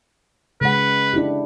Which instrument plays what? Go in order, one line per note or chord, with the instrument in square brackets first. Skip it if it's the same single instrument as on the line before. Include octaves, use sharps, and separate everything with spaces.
[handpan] C#3 G#3 F#5 [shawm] B4
[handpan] D4 E4 G4